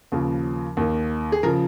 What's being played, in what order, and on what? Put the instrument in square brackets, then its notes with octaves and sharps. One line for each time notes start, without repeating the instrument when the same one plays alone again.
[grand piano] D#2 C#3 F3
D#2 D#3
G#4
C#3 F3 A#4